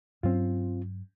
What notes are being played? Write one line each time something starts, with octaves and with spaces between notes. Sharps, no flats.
G2 F#3 C4 C#4 F4